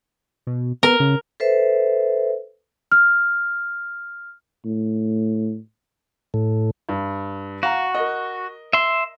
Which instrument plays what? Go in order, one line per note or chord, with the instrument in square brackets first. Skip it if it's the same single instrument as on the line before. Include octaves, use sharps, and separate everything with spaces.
[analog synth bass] B2
[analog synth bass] B3 [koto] A#4
[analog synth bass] C#3
[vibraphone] A4 B4 C5 E5
[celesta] F6
[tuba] A2
[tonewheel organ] A2
[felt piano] G2
[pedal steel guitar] F#4 [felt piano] F5 A#5
[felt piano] A#4 D#5
[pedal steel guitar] E5 C6